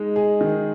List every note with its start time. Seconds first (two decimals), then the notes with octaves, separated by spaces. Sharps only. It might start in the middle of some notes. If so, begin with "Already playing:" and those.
Already playing: G#3 D#4
0.16 G#4
0.41 D#3